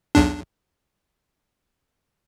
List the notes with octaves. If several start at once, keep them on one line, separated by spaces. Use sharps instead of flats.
B1 E2 D4